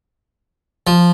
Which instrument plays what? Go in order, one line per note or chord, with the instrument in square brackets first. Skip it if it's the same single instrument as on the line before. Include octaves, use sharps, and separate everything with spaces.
[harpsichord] F3